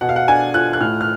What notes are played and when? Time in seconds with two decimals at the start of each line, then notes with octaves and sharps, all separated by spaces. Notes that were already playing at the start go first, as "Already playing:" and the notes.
0.01 B2 F#5
0.09 F5
0.16 F#5
0.28 D4 G#5
0.54 F4 F#6
0.73 F#6
0.81 A2 F6
1.01 F6